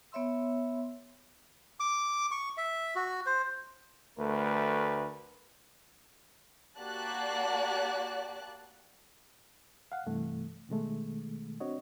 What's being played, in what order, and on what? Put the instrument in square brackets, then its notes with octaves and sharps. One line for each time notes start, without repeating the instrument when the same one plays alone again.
[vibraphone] B3 C#5 E5 C6 E6
[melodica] D6
C#6
E5
F#4
C5
[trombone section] D2 A3 A#4 B4
[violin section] A#3 F#4 G4 D5 A5 F#6
[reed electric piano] F5 F#5
G2 C3 E3 A3
B2 D#3 G#3 A3
C4 D4 F#4 C#5 D#5